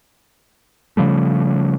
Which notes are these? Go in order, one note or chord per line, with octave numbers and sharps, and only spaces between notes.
C#3 F3 G3 A3